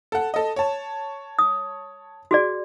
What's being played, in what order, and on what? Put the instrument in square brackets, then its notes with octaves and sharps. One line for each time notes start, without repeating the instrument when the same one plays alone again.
[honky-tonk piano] A4 F#5
A4 D#5
C#5 A5
[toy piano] D#6
F#4 G#4 D5